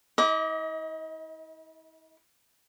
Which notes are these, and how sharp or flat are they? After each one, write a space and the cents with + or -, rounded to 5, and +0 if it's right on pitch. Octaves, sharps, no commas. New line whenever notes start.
E4 -40 D#5 +30 D6 -15